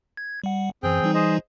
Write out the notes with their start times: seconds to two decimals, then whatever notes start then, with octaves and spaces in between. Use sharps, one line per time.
0.17 G#6
0.44 G3 F#5
0.83 F#2 E3 C4 G#4 G5
1.02 E3 G3 D#4
1.14 G#4 C5 D#5